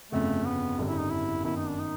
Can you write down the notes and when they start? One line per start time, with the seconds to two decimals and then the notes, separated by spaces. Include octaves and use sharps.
0.12 G1 F2 C#3 A3
0.45 B3
0.78 G#1 F#2 D3 G3
0.89 E4
0.99 D#4
1.11 E4
1.44 G1 F#2 D#3 E4
1.57 D#4
1.68 D4
1.80 D#4